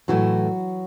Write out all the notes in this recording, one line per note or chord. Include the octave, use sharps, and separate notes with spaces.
A2 E3 F#3 A3 F#4